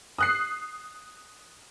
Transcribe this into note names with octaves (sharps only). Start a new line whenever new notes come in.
D#6 F#6 C7